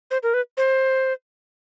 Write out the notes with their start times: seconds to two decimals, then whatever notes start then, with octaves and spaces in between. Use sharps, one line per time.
0.11 C5
0.23 A#4
0.34 B4
0.57 C5